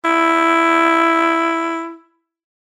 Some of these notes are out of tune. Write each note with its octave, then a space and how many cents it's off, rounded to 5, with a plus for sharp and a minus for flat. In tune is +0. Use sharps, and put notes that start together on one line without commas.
E4 +10